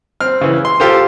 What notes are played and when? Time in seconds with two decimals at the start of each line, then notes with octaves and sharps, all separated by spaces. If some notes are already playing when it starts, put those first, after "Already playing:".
0.20 C4 F6
0.41 C#3 E3
0.65 C6
0.80 F4 G4 A4 A#4 C5